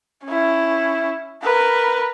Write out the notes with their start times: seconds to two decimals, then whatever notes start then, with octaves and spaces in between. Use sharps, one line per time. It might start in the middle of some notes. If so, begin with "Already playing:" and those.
0.25 C#4 E4
1.43 A#4 B4